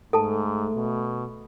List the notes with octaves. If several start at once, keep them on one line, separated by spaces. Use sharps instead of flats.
G#2 A3 A4 A5
B2